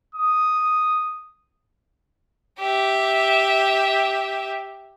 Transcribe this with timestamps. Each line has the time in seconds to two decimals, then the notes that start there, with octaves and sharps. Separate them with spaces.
0.15 D#6
2.59 G4 E5